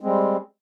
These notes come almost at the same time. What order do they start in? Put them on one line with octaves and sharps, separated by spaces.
G#3 C4 G3